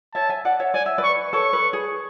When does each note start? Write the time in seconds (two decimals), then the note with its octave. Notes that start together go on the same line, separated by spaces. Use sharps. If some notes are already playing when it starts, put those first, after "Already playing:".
0.14 C#5 E5 A5
0.29 E5 G#5
0.45 D5 F#5
0.60 C#5 E5
0.74 D5 G#5
0.86 E5
0.98 B4 D5
1.04 C#6
1.33 A4 C#5 C#6
1.53 B4
1.73 G#4